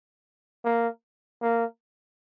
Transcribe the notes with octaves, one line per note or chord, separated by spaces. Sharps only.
A#3
A#3